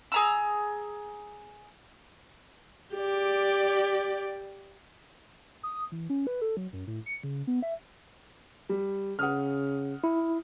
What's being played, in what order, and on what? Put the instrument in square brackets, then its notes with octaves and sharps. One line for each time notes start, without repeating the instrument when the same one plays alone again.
[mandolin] G#4 A#5 E6
[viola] G4 D5
[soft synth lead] D#6
E3
C#4
B4
A4
F#3
F#2
A2
C#7
C#3
B3
E5
[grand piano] G3
[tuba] C#3 [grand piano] F#5 D#6 F6
[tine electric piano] E4